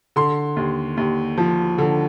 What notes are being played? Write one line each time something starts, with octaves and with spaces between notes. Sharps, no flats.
D3 C6
D#2
D#2
F3
D3